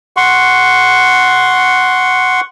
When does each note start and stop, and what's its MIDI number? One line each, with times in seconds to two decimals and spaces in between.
0.17 2.41 78
0.17 2.41 84
0.17 2.41 85